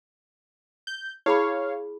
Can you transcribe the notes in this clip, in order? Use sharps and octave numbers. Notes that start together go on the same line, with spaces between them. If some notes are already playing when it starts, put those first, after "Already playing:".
G6
E4 G#4 C#5 F5 B5